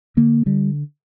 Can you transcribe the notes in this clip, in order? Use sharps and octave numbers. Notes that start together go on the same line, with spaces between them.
D3 A#3
D3 G3